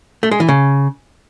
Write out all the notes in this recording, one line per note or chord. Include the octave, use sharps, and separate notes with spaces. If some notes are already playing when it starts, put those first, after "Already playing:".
A3
G#3
E3
C#3